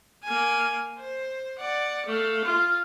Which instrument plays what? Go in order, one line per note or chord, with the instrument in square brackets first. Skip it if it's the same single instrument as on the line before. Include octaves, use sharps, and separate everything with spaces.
[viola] A#3 G#5
C5
D5 F#5
A3 F5
F4